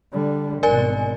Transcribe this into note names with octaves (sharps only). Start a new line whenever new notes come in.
D3 G3
G#1 B2 A#4 D5 G#5